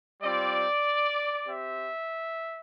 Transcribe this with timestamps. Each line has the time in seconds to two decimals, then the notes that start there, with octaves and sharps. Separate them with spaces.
0.21 G3 C4 F4 D5
1.46 C4 G4 E5